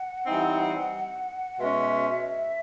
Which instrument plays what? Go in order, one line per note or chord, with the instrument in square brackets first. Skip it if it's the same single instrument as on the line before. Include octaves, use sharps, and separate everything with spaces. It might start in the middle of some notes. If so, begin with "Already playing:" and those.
Already playing: [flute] F#5
[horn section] E3 G3 C4 D#4
[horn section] B2 G#3 C#4 [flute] E5
[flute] E5